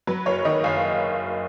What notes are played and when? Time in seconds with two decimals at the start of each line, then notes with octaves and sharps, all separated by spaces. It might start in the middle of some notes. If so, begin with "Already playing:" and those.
0.07 F#3 B4
0.26 F#1 C#5
0.45 D#3 D#5
0.64 F#1 F5